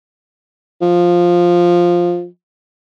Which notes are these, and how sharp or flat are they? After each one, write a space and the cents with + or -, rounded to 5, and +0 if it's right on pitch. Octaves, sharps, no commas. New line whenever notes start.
F3 +5